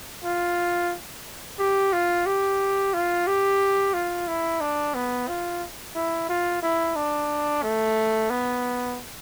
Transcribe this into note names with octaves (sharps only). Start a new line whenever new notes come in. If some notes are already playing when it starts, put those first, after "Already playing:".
F4
G4
F4
G4
F4
G4
F4
E4
D4
B3
F4
E4
F4
E4
D4
A3
B3